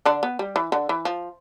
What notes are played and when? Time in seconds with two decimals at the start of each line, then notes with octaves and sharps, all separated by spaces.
0.06 D3 D4
0.23 B3
0.39 G3
0.56 E3
0.72 D3
0.89 E3
1.05 F3